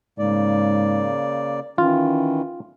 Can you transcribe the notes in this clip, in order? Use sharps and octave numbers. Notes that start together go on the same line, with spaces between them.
G#2 C#3 A#3 D5
D#3 E3 C#4 F4